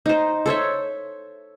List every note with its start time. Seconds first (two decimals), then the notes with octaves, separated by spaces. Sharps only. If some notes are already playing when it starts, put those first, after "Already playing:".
0.06 D#4 C5
0.46 A4 C5 C#5 E5